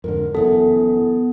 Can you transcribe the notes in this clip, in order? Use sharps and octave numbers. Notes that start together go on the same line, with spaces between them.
F2 G#2 D3 A#4
F#1 F#2 E3 B3 A4